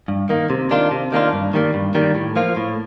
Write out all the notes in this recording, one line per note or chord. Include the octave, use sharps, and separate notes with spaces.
G2
D#3 A#3
C3
D#3 A#3 D4 F4
C3
D#3 A#3 D4 F4
G2
D#3 G3 A#3
G2
D#3 G3 A#3
A2
F3 A#3 F4
A2